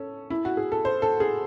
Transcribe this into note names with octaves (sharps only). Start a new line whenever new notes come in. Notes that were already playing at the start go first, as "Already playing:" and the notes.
Already playing: C#4 A4
E4
F#4
G#4
A4
C5
A4
G#4